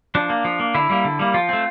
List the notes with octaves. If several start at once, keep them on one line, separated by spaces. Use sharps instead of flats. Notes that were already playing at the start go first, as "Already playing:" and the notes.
F3 D4
A#3
F3
A#3
D3 E4
G3 A#3
D3
G3 A#3
F3 F4
A3 C4